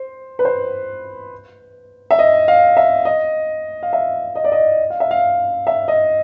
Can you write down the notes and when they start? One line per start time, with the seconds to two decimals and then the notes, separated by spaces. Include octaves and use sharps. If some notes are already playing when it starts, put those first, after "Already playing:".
Already playing: C5
0.39 B4
0.45 C5
2.11 E5
2.19 D#5
2.48 F5
2.77 E5
3.05 D#5
3.83 F5
3.93 E5
4.36 D#5
4.44 D5
4.52 D#5
4.90 F5
5.00 E5
5.11 F5
5.67 E5
5.88 D#5